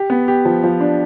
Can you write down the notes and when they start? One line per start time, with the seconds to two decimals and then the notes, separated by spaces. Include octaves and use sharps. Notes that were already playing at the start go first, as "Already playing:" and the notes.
Already playing: G4
0.10 B3
0.28 G4
0.45 F3
0.64 F3
0.80 D4